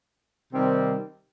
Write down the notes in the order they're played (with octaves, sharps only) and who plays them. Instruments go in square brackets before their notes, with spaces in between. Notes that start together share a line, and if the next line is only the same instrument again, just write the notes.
[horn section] C3 D#3 G3 C4